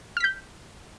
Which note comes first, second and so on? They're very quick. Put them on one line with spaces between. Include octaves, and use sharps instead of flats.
F6 B6 G6